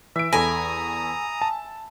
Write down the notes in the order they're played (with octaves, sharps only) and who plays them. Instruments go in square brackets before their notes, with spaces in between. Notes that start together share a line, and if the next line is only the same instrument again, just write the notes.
[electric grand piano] E3 D7 [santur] E5
[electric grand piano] E2 A4 A#6 [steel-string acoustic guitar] G#5 [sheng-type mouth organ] A#5 D#6 [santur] B5
[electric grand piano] A5